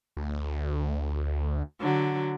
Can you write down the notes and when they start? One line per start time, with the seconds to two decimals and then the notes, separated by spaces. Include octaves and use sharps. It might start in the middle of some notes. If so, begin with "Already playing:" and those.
0.17 D2
1.81 D3 F#3